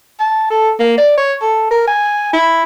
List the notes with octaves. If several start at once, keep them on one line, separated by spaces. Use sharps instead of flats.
A5
A4
A#3
D5
C#5
A4
A#4
G#5
E4